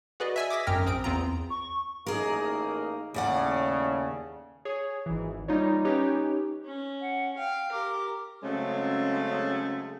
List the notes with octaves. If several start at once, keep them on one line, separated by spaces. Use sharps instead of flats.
F#4 G#4 B4 D5 D#5
E5 G#5 E6
D6 D#6 G#6 A#6 B6
G#1 F#2 G5 A#5 F6
A#1 C4 D#6 D7
E2 C4 F4 A#5
C#6
A1 A#3 D#4 G#4 A#4
D#2 A2 C#3 D5 F#5
G#4 C#5
G#1 E3
G3 A#3 D#4 F4 C#5
C#4 D#4 G4 B4 C#5
C#4
F#5
F5 G5
G4 A#4 D6
C#3 F#3 G#3 A3 C4 C#4